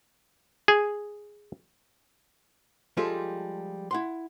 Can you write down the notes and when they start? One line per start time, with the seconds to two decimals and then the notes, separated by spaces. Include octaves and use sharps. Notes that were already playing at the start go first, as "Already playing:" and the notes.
0.68 G#4
2.97 F3 G3 G#3 F4 G4 A4
3.91 E4 F#5 C6